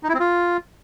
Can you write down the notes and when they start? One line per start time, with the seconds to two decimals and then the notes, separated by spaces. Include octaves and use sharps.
0.03 D#4
0.09 E4
0.14 C4
0.20 F4